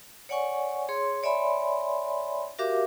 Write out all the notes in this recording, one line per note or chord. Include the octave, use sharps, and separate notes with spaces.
C#5 D5 F#5 G#5 C#6
G#4 C#5 C6
C#5 D5 E5 G#5 B5 C6
F#4 G4 A#4 E5 F5 D6